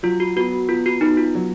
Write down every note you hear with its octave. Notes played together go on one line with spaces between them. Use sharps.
F#3 F4
F#4
B3 F#4
B3 F4
F#4
B3 D#4
F4
F#3